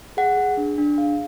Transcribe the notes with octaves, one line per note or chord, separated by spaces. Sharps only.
G#4 F#5
G#4
D4
D4
G#4 F5